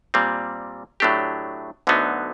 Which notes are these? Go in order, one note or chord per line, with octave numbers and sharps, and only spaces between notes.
A#2 G3 C4
A2 F#3 A3 D4 G4
D2 D3 F#3 B3 D#4